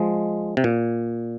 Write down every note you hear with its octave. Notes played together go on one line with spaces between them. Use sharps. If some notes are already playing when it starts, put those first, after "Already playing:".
Already playing: F3 G#3
C3
A#2